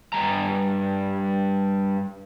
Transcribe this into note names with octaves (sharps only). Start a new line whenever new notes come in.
G2 C3 G3 A#5